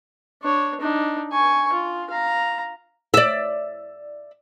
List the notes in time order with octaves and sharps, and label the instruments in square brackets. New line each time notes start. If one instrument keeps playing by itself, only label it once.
[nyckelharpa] D4 C#5
D4 D#4
G#5 C#6
F4
F5 A#5
[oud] D5 E5